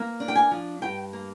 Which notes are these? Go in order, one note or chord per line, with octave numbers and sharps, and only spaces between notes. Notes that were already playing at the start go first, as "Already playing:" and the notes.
Already playing: A#3
D4
G5
G#5
F3
G2 G5
A#3